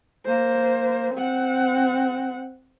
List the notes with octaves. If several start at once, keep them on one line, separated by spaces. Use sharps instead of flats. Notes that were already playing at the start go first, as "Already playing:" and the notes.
A#3 C5
C4 F#5